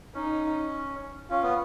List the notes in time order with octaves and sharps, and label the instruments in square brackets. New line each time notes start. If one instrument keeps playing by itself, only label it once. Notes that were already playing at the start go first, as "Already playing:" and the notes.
[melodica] C#4 [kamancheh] D#4
[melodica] C#4 [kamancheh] F4
[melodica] B3